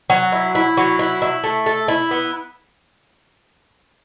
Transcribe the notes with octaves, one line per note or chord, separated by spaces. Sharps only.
F#3
E4
E4
F#3
E4
E4
A3
A4
E4
B3